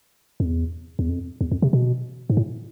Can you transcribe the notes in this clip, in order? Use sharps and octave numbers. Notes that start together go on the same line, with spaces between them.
F2
E2
E2
F2
E2
F2
C3
B2
G#2
A2